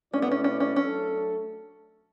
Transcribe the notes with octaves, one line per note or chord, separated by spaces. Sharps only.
B2 A3 C#4 E4 B4 D5
B3
C#4
C#4
C#4
F#3 A3 C#4 D4 A4